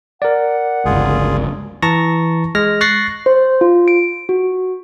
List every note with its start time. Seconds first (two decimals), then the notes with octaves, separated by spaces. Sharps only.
0.22 A#4 D5 F#5
0.85 G1 C#2 F4 G#4
1.82 E3 A5 A#5 C#6 A#6
2.55 G#3 F6 A#6
2.81 C#6 F#6 A6 A#6 C7
3.26 C5
3.61 F4
3.88 D7
4.29 F#4